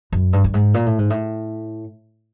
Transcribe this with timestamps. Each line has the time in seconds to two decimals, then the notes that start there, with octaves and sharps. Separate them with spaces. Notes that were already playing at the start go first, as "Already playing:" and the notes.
0.12 F#2
0.33 G2
0.44 G2
0.54 G#2
0.74 A#2
0.86 A2
0.99 G#2
1.10 A2